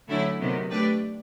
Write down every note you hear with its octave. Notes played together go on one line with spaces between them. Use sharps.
D3 F#3 A3 C#4 E4
C3 D#3 F#3 B3
A3 D4 G4 B4 D5